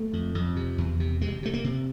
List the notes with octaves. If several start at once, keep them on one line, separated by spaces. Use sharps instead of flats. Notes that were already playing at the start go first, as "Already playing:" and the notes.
Already playing: A3
F2
F2
C3
E2
C3
C3 G#3
C3 A3
A#3
C3